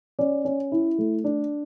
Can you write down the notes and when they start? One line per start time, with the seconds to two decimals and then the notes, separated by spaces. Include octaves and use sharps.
0.19 C#4 D5
0.45 C#4
0.72 E4
0.98 A3
1.24 D4